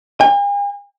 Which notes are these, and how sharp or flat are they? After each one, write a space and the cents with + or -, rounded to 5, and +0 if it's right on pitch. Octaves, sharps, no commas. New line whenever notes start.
G#5 -45